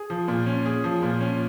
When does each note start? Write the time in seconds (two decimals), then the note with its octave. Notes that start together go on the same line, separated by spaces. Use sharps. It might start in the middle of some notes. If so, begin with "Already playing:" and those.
Already playing: G#4
0.10 F3
0.28 A#2
0.46 C#4
0.66 G#4
0.84 F3
1.02 A#2
1.21 C#4